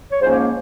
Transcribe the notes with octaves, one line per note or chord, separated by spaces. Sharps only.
C#5
G#2 F3 A#3 C#4 C5
C#5